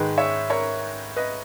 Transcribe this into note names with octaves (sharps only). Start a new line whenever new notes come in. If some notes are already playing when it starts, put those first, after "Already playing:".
Already playing: G#2 D#3 G#3 B4
C#5 E5
A#4 C#5
B4 D#5